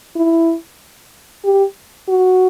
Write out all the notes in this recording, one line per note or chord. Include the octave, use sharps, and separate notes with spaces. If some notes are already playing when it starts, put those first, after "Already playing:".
E4
G4
F#4